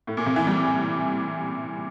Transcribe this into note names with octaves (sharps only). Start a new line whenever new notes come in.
A2
A#2
C3
E3
G3